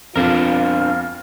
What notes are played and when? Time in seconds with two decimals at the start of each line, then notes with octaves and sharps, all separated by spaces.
0.16 F2 B3 D4 F4 A#4 F5